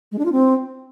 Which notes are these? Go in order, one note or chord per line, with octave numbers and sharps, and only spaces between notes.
G#3
D4
F4
C4